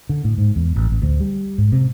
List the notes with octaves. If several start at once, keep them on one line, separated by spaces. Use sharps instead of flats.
D3
A2
G#2
E2
A1
A1
D2
G3
G#2
C3